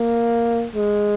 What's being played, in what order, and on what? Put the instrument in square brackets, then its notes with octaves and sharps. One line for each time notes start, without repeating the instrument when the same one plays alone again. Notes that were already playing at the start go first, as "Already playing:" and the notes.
Already playing: [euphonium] A#3
G#3